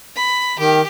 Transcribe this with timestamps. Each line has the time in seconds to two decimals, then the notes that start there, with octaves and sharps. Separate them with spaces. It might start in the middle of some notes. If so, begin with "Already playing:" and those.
0.16 B5
0.59 D#3 G4